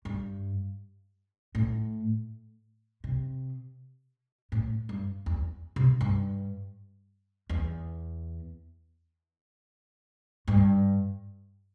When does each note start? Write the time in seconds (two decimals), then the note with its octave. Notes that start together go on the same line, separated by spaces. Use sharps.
0.05 G2
1.55 A2
3.04 C3
4.52 A2
4.89 G2
5.26 E2
5.76 C3
6.01 G2
7.49 E2
10.47 G2